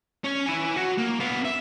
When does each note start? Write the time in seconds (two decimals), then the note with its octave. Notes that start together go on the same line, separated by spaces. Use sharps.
0.24 C#4 C#5
0.46 E4 G#5
0.77 F#4 C#5
0.98 A#3
1.20 B3 F5
1.45 E5